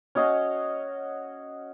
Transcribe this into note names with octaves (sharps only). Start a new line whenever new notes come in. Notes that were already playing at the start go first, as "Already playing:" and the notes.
C#4 F#4 D#5 F5